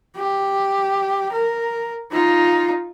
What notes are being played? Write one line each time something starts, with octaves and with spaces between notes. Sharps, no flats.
G4
A#4
D#4 F4